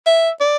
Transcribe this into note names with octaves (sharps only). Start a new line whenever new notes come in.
E5
D5